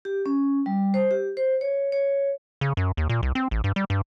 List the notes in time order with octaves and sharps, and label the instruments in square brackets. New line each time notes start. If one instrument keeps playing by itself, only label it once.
[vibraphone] G4
C#4
G3
C5
G4
C5
C#5
C#5
[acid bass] C#3
F#2
D#2
A#2
C2
C4
A1
G2
G3
G2